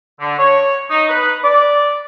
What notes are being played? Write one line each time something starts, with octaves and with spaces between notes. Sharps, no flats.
D3
C#5
D#4
B4
D5